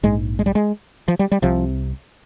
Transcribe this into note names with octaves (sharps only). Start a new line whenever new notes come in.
A#1 G#2 G#3
G#3
G3
G#3
F3
G3
G3
C2 C3 F3